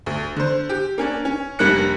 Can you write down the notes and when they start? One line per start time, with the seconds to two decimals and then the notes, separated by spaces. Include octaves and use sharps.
0.06 D2
0.36 D3 C5
0.70 G4
0.98 A#3 C#4 D4
1.25 C#4
1.59 F1 G3 A#3 D4 F#6 C#7